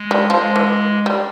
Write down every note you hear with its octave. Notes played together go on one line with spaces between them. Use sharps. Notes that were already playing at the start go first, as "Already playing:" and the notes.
Already playing: G#3
G3
F3 G#3
E3
G3